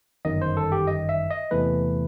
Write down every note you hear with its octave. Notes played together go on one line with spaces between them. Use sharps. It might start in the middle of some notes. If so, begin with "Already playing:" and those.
G1 F#2 D#3 D#5
C5
A4
G4
D#5
E5
D#5
E2 C3 E3 A3 B4